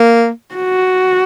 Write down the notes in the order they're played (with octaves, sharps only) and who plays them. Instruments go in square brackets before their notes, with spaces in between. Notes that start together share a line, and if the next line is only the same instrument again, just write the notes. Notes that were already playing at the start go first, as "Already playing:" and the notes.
Already playing: [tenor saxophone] A#3
[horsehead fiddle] F#4